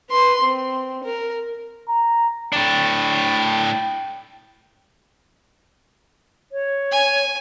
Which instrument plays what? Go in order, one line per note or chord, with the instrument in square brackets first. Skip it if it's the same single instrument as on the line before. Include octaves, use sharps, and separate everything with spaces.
[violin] B4 C6
C4
A#4
[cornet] A#5
[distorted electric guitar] A2 D4 [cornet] G5
[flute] C#5
[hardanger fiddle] G#5